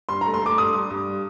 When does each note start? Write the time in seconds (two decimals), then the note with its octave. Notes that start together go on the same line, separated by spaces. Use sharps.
0.09 G2 C6
0.21 A#5
0.26 A3
0.34 C6
0.42 A3 D6
0.57 G2 D#6
0.74 G2
0.90 G2